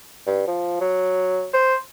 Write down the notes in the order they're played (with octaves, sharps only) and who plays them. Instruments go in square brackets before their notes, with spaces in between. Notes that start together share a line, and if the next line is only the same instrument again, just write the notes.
[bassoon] G2
F3
F#3
C5